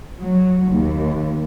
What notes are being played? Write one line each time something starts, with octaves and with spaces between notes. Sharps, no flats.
F#3
D#2